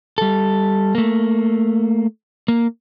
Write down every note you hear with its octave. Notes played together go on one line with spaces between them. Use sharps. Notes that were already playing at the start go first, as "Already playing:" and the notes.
G3 A4
A3 A#3
A#3